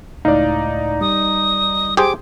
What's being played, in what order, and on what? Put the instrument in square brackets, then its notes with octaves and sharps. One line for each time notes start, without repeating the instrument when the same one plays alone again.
[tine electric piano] C#2 A2 F5 [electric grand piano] D#4 D5
[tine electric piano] G3 [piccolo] D#6
[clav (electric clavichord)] G4 G#4 C5 [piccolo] D6